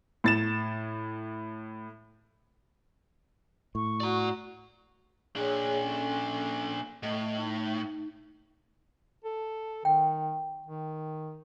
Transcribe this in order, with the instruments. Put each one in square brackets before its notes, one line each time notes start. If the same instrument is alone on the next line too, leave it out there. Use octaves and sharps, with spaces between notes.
[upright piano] A2 A6 E7
[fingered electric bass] A2 [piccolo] C#6
[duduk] F#4 [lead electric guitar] D5 A#5
[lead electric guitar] A#2 D4 [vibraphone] G#4 C#5
[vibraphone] C#4 A4
[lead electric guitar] A2 [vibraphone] D#5
[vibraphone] D#4
[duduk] A4
[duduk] D#3 [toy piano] G5
[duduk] D#3